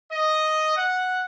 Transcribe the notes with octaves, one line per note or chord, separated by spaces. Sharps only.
D#5
F#5